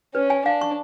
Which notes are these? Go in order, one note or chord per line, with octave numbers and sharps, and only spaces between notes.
C#4 B4
G#5
D4 F5
C#6